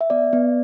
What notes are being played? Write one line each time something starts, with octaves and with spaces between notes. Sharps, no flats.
E5
B3 D5
B3